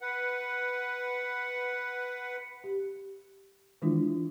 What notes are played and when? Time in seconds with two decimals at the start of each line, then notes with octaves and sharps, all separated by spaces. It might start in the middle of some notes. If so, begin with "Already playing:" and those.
0.01 B4 F#5
2.64 G4
3.82 D#3 E3 G#3 D4 E4 F4